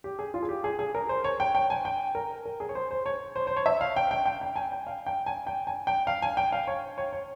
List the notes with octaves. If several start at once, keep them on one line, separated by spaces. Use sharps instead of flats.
G4
G#4
F4
G#4
G4
G#4
G#4
A#4
C5
C#5
G5
G5
G#5
G5
A#4
A#4
G#4
C#5
C5
C5
C#5
C5
C5
C#5
E5
F5
G5
G5
G5
G5
G#5
G5
F5
G5
G#5
G5
G#5
G5
F5
G#5
G5
F5
C#5
C#5
C#5